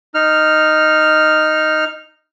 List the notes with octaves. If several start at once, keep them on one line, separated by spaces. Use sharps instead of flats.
D#4 F6